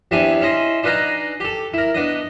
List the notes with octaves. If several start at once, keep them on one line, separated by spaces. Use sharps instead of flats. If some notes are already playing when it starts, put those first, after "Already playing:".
E2 G3 C4 D4 E4 G#5
C#4 E4 C5 D#5
D4 D#4 B4 F5 G#5 A#5
G4 A4
E4 A#4
B3 D4 D#5